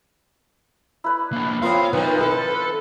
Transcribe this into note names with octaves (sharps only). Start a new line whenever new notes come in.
E4 B4 D5
A#3 D4
A2 B3 C4 F4 A#4 F5
B1 D#3 F3 D#4 B4
E4 A4